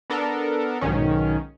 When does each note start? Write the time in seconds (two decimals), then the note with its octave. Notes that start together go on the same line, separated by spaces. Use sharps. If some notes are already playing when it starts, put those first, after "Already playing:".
0.10 B3 D4 A4 A#4
0.81 B1 G#2 D#3 C#4